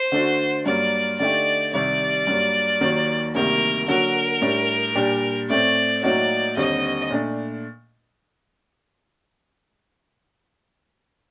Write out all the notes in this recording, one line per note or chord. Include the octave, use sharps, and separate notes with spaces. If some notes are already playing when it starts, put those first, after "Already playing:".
Already playing: C5
D3 A3 D4 F#4
G2 F#3 A#3 D5
D3 A3 D#4 G4 D5
C2 C3 D#3 D5
G2 F#3 A#3
D#2 D#3 F#3 A#3 F#4
D2 C3 D#3 G3 A#3 A#4
D3 F#3 A#3 F#4 A#4
A2 G3 D4
A#2 G3 D4 G4
A2 A3 C4 D5
A2 F#3 A#3 D#4 F#4 D5
D#2 D3 G3 C4 D#5
A#2 A3 D4